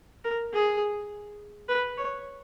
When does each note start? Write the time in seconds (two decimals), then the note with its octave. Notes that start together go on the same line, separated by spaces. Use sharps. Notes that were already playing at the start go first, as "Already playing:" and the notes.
0.24 A#4
0.53 G#4
1.68 B4
1.97 C#5